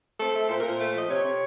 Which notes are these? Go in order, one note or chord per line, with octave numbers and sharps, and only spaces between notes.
C4 A4
A3
A#2 C5
A#4
A#2 C5
A3
F3 D#5
C3 C#5
C3